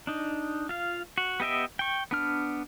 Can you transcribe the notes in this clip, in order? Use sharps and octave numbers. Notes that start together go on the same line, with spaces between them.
D4 D#4
F4 F5
F#4
B3 G4 D#5 E5 G5
G5 C#6
B3 D4 F6